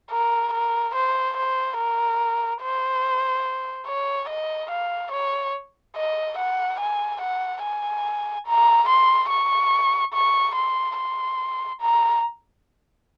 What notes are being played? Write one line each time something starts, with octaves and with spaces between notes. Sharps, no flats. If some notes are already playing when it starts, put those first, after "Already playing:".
A#4
A#4
C5
C5
A#4
C5
C#5
D#5
F5
C#5
D#5
F#5
G#5
F#5
G#5
A#5
C6
C#6
C#6
C6
C6
A#5